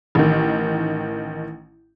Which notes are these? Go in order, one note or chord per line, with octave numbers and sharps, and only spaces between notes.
A1 D#3